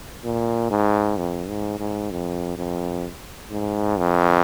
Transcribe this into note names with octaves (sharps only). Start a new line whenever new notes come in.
A#2
G#2
F2
G#2
G#2
F2
F2
G#2
F2